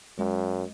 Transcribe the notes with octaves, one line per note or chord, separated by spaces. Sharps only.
F#2 G#3